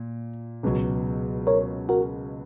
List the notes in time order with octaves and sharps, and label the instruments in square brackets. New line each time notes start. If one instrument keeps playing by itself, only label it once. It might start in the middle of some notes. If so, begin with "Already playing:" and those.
Already playing: [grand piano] A#2
C#2 B2 F#3
[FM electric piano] A#4 C#5
F#4 A#4